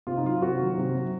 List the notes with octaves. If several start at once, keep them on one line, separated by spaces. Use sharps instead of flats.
C3 F4
D#4
F#3 F4
C3 F#4
D#3 F#3
C3
F#3